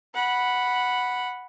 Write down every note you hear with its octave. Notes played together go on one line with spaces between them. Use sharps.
F#5 B5